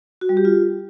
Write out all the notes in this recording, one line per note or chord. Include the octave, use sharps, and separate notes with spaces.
F#4
G3
G4
F4